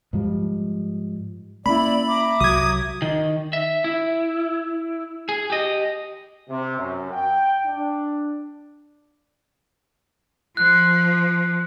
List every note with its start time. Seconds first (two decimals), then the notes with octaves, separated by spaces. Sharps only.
0.13 G#2 F3 G3
1.66 A#3 C#4 E4 D5 B5
2.06 E5 A#5 D6
2.40 C2 F#3 D#6 G#6
3.02 D#3
3.53 E5
3.84 E4
5.29 G#4
5.50 G4 D#5
6.49 C3
6.78 F#2
7.12 G5
7.66 D4
10.57 F3 F#6